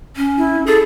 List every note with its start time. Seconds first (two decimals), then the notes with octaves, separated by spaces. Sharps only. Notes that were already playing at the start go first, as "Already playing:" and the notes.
0.16 C#4
0.37 E4
0.66 G#4 A4